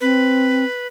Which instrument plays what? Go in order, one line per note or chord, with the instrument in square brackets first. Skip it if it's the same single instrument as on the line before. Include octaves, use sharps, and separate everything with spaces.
[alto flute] C4 [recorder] B4